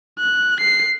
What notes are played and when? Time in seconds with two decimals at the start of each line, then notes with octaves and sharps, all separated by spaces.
0.19 F#6
0.61 C7